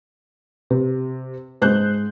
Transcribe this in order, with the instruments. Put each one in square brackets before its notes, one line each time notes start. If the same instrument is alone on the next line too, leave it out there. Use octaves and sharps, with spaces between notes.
[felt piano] C3
[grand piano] G#2 G#3 [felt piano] C5 F#6 G6